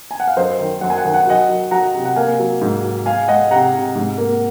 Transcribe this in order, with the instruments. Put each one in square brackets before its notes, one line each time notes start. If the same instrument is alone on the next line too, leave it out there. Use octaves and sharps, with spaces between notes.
[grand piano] G#5
F#5
F5
F#2 C5 D#5
D#3
F#2 F#5
G#5
F#5
D#3 G#5
F#5
G#5
F#3 D#5 F#5
F#3
F#3 F#5 A#5
C3
F#5
A#3 F5 G#5
F#3
G#2
F#3
G#3 F5 G#5
G#3 D#5 F#5
C3 F#5 A#5
C3
G#2
A#3